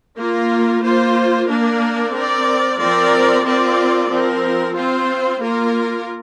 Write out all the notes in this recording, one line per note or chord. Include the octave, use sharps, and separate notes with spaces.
A#3 F4 A#4
A#3 F4 C5
A#3 D4 A#4 D5
C4 A#4 D5
F3 C4 A#4 D5
C4 F4 A#4 D5
F3 C4 A#4
C4 F4 C5
A#3 F4 A#4